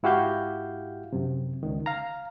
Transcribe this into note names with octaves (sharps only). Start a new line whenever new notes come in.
G#2 E4 F#4 G4 F5 G6
F#2 C3
C#2 D#3
F5 A#5